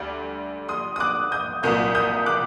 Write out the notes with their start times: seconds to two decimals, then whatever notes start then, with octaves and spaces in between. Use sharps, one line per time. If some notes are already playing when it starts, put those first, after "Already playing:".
Already playing: D2 D3 G3 D6
0.69 C6 D#6
0.96 D#6
1.00 D6 F#6
1.32 D#6 G6
1.63 C2 A#2 F#3 D#6 G6
1.95 D#6 G6
2.26 D6 F#6